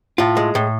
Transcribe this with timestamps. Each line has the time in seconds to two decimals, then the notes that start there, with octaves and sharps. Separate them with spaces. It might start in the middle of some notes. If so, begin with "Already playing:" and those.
0.18 A2 F4
0.37 G#3
0.55 A2